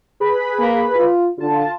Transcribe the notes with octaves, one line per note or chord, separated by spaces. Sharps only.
G#4 B4 B5
A#3
F4
D3 F4 A5